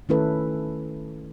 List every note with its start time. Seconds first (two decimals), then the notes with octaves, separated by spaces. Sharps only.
0.09 D#3 A3 C#4 E4 A4 B4